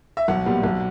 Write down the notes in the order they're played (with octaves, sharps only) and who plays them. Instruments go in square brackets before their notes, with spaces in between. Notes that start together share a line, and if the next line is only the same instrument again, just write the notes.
[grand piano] E5
B1 F#5
A#2 G3 B3
B1